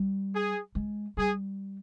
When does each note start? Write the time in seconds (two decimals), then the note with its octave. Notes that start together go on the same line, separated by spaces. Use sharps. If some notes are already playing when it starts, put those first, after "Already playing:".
Already playing: G3
0.33 G#4
0.75 G#3
1.17 G3 G#4